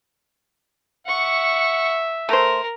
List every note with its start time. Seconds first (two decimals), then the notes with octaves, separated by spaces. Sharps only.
1.07 E5 F#5 C#6
2.29 A3 A#4 C5